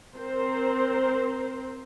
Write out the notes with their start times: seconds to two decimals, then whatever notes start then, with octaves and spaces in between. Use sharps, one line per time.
0.18 C4 A#4 C5